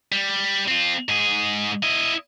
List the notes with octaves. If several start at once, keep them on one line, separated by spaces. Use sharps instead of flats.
G3
C4 F4
G#2 G#4
E4 D#5